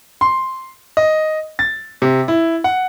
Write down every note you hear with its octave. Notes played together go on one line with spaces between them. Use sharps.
C6
D#5
A6
C3
E4
F#5